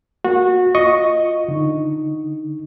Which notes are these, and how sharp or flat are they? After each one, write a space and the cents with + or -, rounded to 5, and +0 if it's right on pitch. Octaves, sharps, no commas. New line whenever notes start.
A#3 +0 F#4 -20
F4 +0 D#5 +0 C#6 +0
D3 +10 D#4 +0